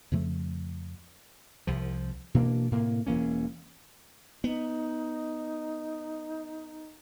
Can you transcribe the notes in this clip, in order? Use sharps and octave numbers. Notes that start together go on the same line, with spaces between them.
F2 C#3 F3 A3
C2 F3
B2 E3 A#3 D4
A2 C3 A#3
E1 E3 A#3 C#4
B3 D#4